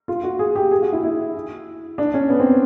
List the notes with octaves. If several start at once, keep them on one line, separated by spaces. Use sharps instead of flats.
F4
F#4
G#4
G4
G#4
F#4
E4
E4
D4
C#4
B3
C4